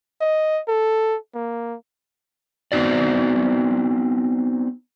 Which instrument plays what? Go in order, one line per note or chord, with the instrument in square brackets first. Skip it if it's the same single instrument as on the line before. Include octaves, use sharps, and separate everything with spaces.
[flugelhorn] D#5
A4
A#3
[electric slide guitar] B3 C4 D#4 F#4 D5